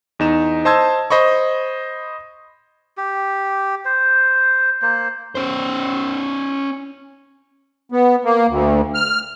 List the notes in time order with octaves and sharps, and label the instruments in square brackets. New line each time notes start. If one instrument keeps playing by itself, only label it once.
[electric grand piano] E2 D#4 E7
C5 D#5 A5 C6 E6 G#6
C5 D#5 B5 C#6
[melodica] G4
C5
A#3 C5
[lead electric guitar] C#4 C5
[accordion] B3
A#3
D2
F6